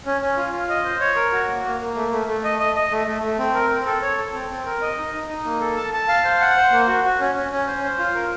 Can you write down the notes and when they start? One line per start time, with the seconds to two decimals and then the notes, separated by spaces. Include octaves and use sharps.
0.06 C#4
0.21 C#4
0.37 F4
0.53 F4
0.69 D#5
0.85 C5
1.01 C#5
1.16 A#4
1.32 F#4
1.48 A#3
1.65 A#3
1.80 A#3
1.95 A3
2.12 A3
2.27 A3
2.44 D#5
2.59 D#5
2.76 D#5
2.91 A3
3.07 A3
3.23 A3
3.38 C4
3.54 A#4
3.70 C4
3.86 A4
4.02 C#5
4.18 A4
4.34 C4
4.50 C4
4.66 A#4
4.82 D#5
4.98 D#4
5.13 D#4
5.29 D#4
5.45 A#3
5.60 A4
5.77 A5
5.93 A5
6.08 F5
6.24 C5
6.41 F#5
6.56 C5
6.71 A#3
6.87 F#4
7.04 F#4
7.20 C#4
7.35 C#4
7.52 C#4
7.67 C5
7.83 C5
7.98 F4
8.15 A#4